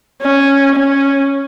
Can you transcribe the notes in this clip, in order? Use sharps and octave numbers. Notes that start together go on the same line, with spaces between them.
C#4
C#4